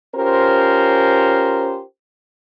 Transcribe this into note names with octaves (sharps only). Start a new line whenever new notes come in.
C#4 F4 G4 A#4 C5